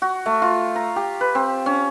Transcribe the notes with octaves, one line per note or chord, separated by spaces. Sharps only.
F#4
A3
F4
A#5
G4
B4
C4
C#4